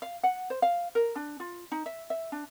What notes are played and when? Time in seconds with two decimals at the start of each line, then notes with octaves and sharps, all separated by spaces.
0.02 F5
0.23 F#5
0.50 C5
0.62 F5
0.95 A#4
1.16 D4
1.40 F4
1.72 D#4
1.86 E5
2.10 E5
2.32 D4